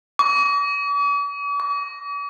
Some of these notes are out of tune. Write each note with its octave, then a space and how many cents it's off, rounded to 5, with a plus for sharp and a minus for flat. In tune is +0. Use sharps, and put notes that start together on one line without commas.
D6 -45
D6 -45